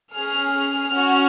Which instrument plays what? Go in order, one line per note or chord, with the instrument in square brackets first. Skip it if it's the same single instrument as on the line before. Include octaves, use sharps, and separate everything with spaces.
[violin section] C#4 G#4 F6
C#4 F#4